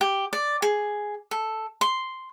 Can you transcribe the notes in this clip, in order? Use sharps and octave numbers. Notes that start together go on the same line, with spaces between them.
G4
D5
G#4
A4
C6